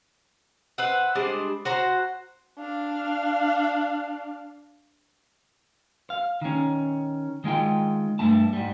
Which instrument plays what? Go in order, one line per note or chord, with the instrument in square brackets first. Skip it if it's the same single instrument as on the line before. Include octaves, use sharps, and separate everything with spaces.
[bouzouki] B4 C5 E5 F#5
G3 G#3 D4 C5
F#4 C5 A#5
[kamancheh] D4 F5
[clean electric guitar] F5
D#3 C#4
D#3 G#3 F4 G5
G2 A3 A5
G#2 G3